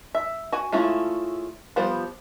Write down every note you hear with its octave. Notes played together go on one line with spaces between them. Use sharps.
E5
F#4 G#5
G#3 A3 C#4 E4 F4
F3 G3 B3 C5